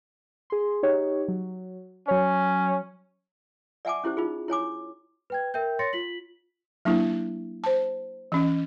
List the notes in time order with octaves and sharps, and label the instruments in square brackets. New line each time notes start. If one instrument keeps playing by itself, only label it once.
[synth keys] G#4 C6
D#4 G4 C#5
F#3
[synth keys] F#3 C#5 [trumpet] C#4
[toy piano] D5 E5 F#5 G#5 A5 D6
C#4 E4 G4 C5
D#4 F4 G#4
E4 C#5 G#5 D6
[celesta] B4 G5 G#6
A#4 E5 G5 G6
C#5 C6 A6 A#6 C#7
F4 B6 F#7
[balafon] F#3 A#3 D4 E4
C5 A5
E3 C#4 D#5